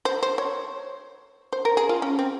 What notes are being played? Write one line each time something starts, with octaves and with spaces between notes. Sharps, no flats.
C5
C5
C#5
C5
A#4
G#4
F4
C#4
C4